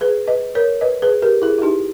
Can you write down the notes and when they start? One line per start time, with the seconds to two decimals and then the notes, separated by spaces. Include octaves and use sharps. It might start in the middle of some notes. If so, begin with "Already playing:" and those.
0.01 G#4 B4
0.27 B4 D#5
0.55 A#4 C#5
0.81 B4 D#5
1.02 G#4 B4
1.22 G4 A#4
1.42 E4 G#4
1.58 E4
1.62 D#4 G4